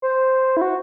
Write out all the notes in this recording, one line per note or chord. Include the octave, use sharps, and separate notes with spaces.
C5
E4
F#4